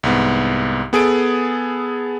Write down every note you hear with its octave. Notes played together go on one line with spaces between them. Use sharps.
C2 G#2 B3
B3 G#4 A4 D7